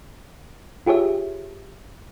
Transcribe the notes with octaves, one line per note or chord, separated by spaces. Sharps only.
F4 G4 G#4 C#5 E5